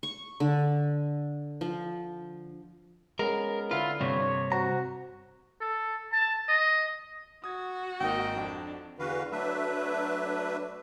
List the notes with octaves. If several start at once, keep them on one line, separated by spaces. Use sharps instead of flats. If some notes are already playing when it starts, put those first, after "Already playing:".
C#6
D3
F3
G#3 B3 C#4 A#4
D3 B3 E4 F4 B4
G2 C3 C#5
F#4 C5 A#5
A4
A5
D#5
F#4 D#6 G#6
G#1 A#3 D#4 A#4 D#5 G5
F2 D4
E2 D3 E3 F#4 B4 F5
F#3 A3 D4 B4 E5